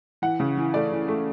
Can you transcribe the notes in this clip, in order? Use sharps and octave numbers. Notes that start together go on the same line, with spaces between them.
E3 F#5
C#3
E3
A3 D5
E3
A3